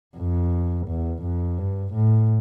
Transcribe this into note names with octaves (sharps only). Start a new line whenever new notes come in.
F2
E2
F2
G2
A2